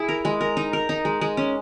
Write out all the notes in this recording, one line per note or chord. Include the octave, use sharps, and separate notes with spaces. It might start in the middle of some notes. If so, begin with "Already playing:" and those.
Already playing: E4 G#4
A#4
G#3
A#4
D#4
A#4
D#4
G#3
G#3
C#4